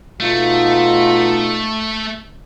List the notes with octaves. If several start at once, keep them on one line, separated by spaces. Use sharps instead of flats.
B2 A3 D#4 F4